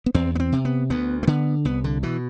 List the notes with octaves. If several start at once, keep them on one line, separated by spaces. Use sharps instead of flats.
B3
E2 C4
B3
C4
C3
B3
D2 B3
A3
D3 B3
C2 B3
D3
B2 E3